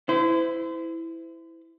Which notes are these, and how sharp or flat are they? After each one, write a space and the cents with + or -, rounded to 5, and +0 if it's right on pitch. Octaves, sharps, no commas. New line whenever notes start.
E4 +0 C5 -40